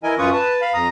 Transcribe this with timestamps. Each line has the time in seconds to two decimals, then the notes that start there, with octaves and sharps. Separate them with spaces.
0.03 E3 E4 A#4 D#5 G#5
0.18 F#2 C#4 F4 B4 C#6 D#6
0.33 B4 A5
0.62 F5 B5
0.74 F2 A#5 D#6